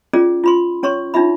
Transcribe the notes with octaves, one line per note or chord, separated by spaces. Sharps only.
C#4 F4 G#4 D5
F4 B5 C6
C#4 C#5 C6 C#6
D4 D#4 F4 E5 B5